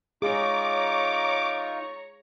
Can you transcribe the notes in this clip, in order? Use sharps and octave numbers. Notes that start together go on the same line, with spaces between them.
D#4 F4 G#4 C#5 A#5 C#6 D6